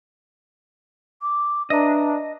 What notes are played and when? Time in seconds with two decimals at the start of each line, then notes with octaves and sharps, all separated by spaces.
1.22 D6
1.70 D4 B4 D#5 E5 A#5